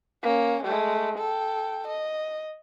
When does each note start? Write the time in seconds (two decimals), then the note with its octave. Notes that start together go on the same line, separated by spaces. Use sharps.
0.23 A#3 C#4
0.63 G#3 A3
1.18 A4 G5
1.87 D#5